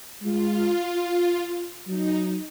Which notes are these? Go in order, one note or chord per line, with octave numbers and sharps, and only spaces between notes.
G#3 F4
F#3 D#4